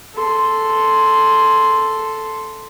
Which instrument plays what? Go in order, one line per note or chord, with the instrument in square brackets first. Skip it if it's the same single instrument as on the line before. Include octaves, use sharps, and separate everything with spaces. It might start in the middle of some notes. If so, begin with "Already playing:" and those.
[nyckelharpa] A4 C6